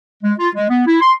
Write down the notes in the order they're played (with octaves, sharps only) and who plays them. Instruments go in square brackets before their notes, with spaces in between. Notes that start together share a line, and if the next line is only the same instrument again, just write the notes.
[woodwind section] G#3
F4
G#3
B3
E4
C6